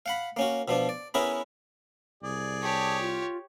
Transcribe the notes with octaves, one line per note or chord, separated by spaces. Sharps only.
F5 F#5 B5
A#3 C#4 F#4
B2 F3 D4
D5
B3 C#4 E4 G#4 A#4 B4
C2 G#4 D5
G4 C#5 A5
F4